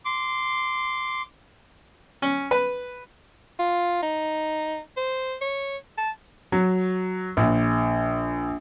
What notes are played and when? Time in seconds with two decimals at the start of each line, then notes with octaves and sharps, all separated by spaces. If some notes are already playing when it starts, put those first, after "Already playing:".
0.05 C6 D6
2.22 C#4
2.51 B4
3.59 F4
4.03 D#4
4.97 C5
5.41 C#5
5.98 A5
6.52 F#3
7.37 A#1